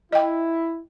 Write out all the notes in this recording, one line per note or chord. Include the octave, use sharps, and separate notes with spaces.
E4 D#5 G5